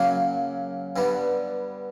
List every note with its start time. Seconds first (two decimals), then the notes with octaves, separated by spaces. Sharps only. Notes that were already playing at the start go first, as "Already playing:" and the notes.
Already playing: F#2 C#3 F#3 A#3
0.96 G2 D3 G3 B3